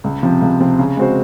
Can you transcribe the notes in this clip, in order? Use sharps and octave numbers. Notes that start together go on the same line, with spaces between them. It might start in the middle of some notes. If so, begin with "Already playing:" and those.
C#2
C3 F3 C4
C#2
C3 F3 C4
C#3
G#3 C4 F#4 C5